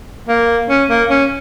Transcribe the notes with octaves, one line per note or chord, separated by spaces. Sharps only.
A#3
C#4
A#3
C#4